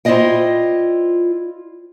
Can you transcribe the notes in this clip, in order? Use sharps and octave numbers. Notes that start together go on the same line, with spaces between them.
E4 F4 C5 D5 D#5 G5